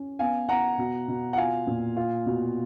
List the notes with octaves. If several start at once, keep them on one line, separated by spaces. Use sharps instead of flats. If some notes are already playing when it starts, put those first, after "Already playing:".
Already playing: C#4
B3 F5 G#5
B3 F#5 A#5
B2
B2
F#5
F4 F5 G#5
A#2
F4
B2